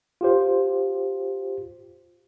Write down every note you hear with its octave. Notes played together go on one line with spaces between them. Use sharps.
F4 G4 C5